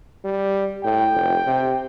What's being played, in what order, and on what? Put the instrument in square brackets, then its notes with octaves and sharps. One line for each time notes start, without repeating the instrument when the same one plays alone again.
[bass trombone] G3
[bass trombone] A2 [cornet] G5
[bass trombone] F1
C3